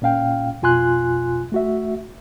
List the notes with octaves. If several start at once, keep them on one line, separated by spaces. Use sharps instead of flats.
A#2 C#4 F5 G5
F2 B2 F4 G#5 C6 F#6
A3 F#4 E5